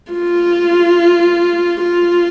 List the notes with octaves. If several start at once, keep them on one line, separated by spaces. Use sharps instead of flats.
F4
F4